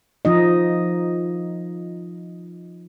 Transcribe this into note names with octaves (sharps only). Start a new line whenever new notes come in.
F3 D#4 D#5